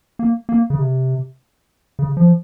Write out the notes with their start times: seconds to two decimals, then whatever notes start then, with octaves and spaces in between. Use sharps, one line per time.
0.19 A#3
0.49 A#3
0.70 C#3
0.79 C3
1.99 C#3
2.17 F3